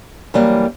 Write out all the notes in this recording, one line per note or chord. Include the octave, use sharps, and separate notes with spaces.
F#2 E3 G3 A#3